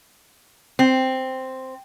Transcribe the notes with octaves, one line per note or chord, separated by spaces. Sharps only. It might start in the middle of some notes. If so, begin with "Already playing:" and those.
C4